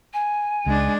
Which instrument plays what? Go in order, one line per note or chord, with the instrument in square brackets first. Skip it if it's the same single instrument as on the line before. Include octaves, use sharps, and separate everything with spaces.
[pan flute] G#5
[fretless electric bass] C#2 [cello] G#3 D4